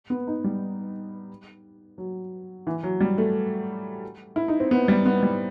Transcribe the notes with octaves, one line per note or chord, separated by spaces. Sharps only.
B3
D#4
G3
F#3
E3
F#3
G3
A3
E4
D#4
C4
B3
G3
B3
G3